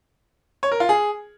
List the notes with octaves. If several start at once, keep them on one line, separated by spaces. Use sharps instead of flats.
C#5
A#4
F4
G#4